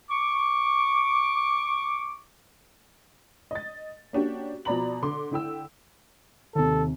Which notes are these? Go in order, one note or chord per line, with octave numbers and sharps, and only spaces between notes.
C#6 D6
D#5 A6
A#3 C#4 D4 F#4 G4
B2 F3 D5 A#5 B5 F#7
D3 C6 D6
D3 E4 G5 E6
D#2 C3 A4